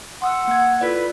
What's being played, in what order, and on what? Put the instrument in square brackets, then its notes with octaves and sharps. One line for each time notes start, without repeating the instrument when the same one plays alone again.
[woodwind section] F#5 [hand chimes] C6 D#6 E6
[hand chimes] A#3 G#6
[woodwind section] E4 A4 B4 [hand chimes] F4 D5